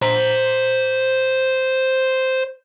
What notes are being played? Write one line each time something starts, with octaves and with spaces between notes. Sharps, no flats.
C5 A#5